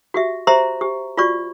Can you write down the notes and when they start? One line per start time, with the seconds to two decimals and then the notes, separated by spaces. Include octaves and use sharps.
0.14 F#4 G4 E5
0.47 G4 C5 E5 A#5 C6
0.81 G4
1.17 F4 F#4 D5 C#6